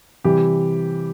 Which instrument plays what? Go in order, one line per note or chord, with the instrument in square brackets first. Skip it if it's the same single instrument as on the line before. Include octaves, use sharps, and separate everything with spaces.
[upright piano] C3 E3 G3 G4